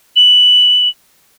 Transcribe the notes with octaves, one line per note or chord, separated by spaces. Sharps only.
F#7